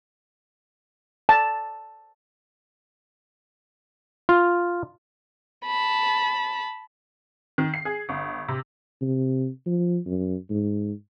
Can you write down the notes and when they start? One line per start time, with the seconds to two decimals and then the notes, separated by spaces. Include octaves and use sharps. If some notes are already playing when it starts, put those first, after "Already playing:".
1.29 A5
4.29 F4
5.66 A5 B5
7.58 D#3
7.74 C7
7.85 G#4
8.09 G1
8.49 C3
9.02 C3
9.66 F3
10.06 F#2
10.50 G#2